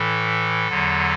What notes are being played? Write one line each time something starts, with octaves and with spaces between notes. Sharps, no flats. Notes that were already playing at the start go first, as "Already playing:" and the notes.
Already playing: A2 E3 A4
E2 D3 F#3